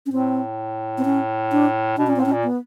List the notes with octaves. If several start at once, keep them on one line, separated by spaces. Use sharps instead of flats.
C#4
A2 C4
C4
C#4
D4
B2 D4
A#2 C#4
A2 C4
C#4
A#2
B3